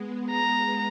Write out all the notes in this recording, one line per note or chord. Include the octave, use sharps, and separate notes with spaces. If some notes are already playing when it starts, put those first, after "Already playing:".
Already playing: G#3 B3
A#5